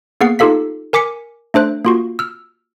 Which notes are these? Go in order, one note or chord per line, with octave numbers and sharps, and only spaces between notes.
A#3 B3 G#4 F#5 C7
D#4 F4 G4 A4 F5 B6
A#4 G#5 D6 B6 C#7
A3 D4 C5 F#6
A#3 F4 F#4
E6 F6